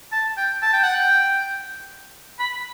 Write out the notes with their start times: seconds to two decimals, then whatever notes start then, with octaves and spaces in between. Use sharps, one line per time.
0.12 A5
0.37 G5
0.63 A5
0.73 G5
0.84 F#5
0.95 G5
2.40 B5